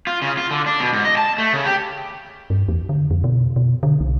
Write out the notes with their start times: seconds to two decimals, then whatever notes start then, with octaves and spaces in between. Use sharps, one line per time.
0.07 F4
0.22 C#3
0.38 F4
0.51 D3
0.66 D4
0.80 B2
0.93 G#2
1.05 D#5
1.17 A5
1.38 A3
1.53 C#3
1.65 G4
2.50 G2
2.68 E2
2.89 D3
3.11 F2
3.24 B2
3.56 B2
3.83 D3
4.00 C2